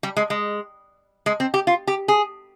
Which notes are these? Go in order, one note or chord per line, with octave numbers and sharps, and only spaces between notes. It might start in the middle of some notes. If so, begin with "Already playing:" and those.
G3
G#3
G#3
G#3
C4
G4
F4
G4
G#4